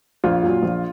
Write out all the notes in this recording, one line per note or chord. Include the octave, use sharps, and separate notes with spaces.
A#1 F4
A#2 F#3
A#1